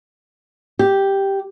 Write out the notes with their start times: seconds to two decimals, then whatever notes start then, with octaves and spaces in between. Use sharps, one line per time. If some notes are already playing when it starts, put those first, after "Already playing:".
0.79 G4